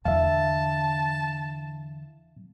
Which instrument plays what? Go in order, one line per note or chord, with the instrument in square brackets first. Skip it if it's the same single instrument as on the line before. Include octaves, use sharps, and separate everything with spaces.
[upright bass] E2 D3 [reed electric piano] E5 F5 [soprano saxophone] A5